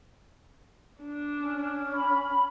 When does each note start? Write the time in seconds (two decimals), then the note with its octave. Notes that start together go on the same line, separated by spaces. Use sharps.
1.02 D4
1.39 C#4
1.94 B5